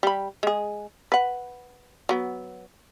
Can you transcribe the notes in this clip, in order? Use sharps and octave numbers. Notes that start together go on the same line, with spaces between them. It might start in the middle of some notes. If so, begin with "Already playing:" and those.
G3 B5
G#3 G#4
B4 F#5
F#3 B3